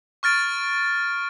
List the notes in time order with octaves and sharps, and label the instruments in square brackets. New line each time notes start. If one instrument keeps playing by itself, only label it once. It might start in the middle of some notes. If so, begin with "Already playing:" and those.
[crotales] C#6 F6 A6 D7